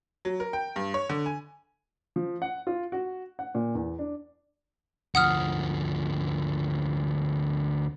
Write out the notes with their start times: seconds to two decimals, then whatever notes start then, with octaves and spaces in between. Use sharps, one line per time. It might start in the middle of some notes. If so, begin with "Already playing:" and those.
0.25 F#3
0.40 A#4
0.53 G5
0.76 G2
0.94 C#5
1.10 D3
1.26 G#5
2.16 F3
2.42 F#5
2.67 F4
2.92 F#4
3.39 F#5
3.55 A#2
3.75 E2
3.99 D4
5.15 D2 F3 F#5 D#6 F6